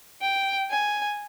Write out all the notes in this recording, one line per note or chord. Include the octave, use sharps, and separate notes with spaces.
G5
G#5